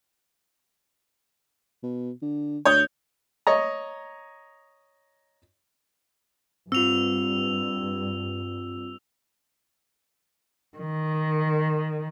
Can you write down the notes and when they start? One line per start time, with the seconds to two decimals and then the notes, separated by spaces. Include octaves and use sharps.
1.83 B2
2.22 D3
2.65 D2 C#5 D#6 G6
3.47 C#5 D#5 A#5
6.72 G2 C4 F4 E6 F7
10.77 D#3